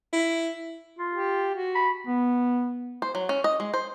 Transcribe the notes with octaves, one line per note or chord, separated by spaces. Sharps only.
E4
F4
G4
F#4
B5
B3
C5
F#3
C#4
D#5
G#3
C5